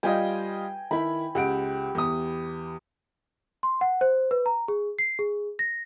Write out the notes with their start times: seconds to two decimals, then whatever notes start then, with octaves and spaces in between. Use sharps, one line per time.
0.03 G3 F4 D#5 G5 G#5
0.91 D#3 E4 B5
1.35 C#2 G4 F#5 D7
1.95 E2 D#6
3.63 C6
3.81 F#5
4.01 C5
4.31 B4
4.46 A#5
4.68 G#4
4.99 C7
5.19 G#4
5.59 A#6